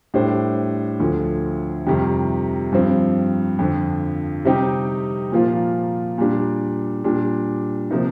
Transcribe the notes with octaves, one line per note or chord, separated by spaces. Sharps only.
A2 G3 D4 G4 C5
D2 D3 F3
F2 C3 D#3 G3
G2 F3 C4
F2 D3 F3
C3 G3 C4 D#4 G4
A#2 F3 A#3 F4
A#2 G3 D4
A#2 G3 D4
C3 F3 A#3 D#4